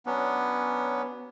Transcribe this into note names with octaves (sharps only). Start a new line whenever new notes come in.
F#3 B3 C#4 D4